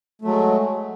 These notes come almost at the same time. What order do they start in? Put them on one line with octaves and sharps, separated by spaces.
A3 F#3 G#3